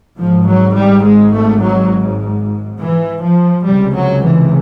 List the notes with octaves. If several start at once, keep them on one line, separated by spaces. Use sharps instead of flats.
G#1 G#2 F3
F#3
G3
G#3
A3
F#3
E3
F3
C#2 C3 G3
F#3
E3